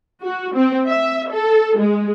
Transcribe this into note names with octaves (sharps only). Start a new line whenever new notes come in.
F#4
C4
E5
A4
G#3